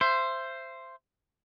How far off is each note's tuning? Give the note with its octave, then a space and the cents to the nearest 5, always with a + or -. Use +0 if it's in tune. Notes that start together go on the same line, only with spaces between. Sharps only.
C5 +0 E5 +30